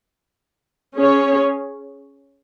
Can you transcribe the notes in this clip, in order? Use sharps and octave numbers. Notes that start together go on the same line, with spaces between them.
C#4 G#4 C#5